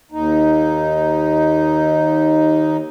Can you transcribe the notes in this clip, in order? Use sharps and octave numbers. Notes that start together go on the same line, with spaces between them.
D#2 D#4